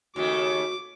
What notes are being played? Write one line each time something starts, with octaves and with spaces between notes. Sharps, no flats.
D#2 C#3 A3 F#4 D6